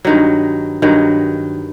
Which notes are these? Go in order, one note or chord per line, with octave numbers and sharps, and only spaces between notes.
G2 D#3 F#3
G2 D#3 F#3